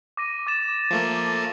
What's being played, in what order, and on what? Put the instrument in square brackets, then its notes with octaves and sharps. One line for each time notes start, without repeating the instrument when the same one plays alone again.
[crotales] D6 A#6 D#7
D6 A6 E7
[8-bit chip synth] F3 A3 A#3